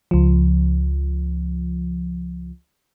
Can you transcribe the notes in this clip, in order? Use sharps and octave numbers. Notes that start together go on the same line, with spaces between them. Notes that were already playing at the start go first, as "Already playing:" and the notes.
C#2 F3